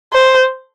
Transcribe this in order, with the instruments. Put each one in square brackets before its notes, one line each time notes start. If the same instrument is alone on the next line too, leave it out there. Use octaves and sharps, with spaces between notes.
[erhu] C5